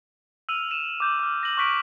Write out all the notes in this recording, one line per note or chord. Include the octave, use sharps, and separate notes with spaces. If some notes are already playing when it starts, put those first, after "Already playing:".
E6 F6 D#7 F7
D#7 E7
D6 G6
D6 F6
A#6 F#7
C#6 F6 F#6 B6 D7